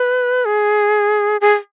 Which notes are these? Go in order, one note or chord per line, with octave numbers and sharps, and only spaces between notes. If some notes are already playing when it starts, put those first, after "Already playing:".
Already playing: B4
G#4
G#4